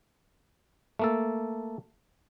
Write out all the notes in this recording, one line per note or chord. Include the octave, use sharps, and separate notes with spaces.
A3 A#3 A4